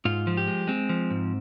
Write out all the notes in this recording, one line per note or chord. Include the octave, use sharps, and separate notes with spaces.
G#2 F4
F3
G4
G#3
G#3 C4
F3
G#2